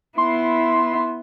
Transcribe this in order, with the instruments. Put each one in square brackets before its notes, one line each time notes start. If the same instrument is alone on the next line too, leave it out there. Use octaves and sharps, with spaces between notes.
[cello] B3 E4 [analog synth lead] C6